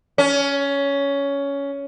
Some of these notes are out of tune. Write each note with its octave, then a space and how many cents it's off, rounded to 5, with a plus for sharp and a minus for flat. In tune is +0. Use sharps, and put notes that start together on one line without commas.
C#4 +15